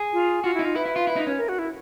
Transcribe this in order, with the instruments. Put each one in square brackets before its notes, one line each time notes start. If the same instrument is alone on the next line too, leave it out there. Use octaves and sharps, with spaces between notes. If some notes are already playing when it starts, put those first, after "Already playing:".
Already playing: [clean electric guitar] G#4
[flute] F4
[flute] F4 [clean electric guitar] F#4
[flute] E4
[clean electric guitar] D#4
[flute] F4
[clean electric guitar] E4 [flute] B4
[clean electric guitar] E4
F4
E4
D#4
C#4
[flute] A#4
F#4
E4